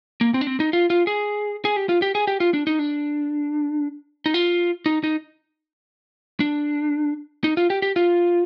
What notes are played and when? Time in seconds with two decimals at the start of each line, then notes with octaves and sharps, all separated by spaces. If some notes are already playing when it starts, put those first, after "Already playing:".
0.21 A#3
0.34 C4
0.41 D4
0.47 C4
0.60 D#4
0.73 F4
0.90 F4
1.07 G#4
1.65 G#4
1.76 G4
1.89 F4
2.02 G4
2.15 G#4
2.27 G4
2.40 F4
2.54 D4
2.67 D#4
2.79 D4
4.26 D#4
4.34 F4
4.86 D#4
5.04 D#4
6.40 D4
7.44 D#4
7.57 F4
7.70 G4
7.82 G4
7.96 F4